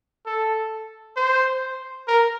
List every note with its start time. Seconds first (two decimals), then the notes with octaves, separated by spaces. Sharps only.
0.26 A4
1.16 C5
2.07 A#4